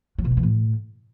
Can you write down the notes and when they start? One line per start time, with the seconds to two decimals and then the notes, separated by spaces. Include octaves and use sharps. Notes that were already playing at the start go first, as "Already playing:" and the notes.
0.18 F#3
0.25 B2
0.31 F#3
0.37 E3
0.43 A2